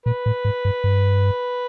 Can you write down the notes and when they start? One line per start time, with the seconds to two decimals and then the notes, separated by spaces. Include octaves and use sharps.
0.06 A#2 B4
0.26 A2
0.45 G#2
0.65 G2
0.84 G2